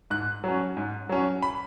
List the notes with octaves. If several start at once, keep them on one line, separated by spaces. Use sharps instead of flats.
G#2 F#6
F#3 C#4
G#2
F#3 C#4
B5